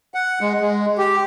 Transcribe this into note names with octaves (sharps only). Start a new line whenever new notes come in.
F#5
G#3
G#3
G4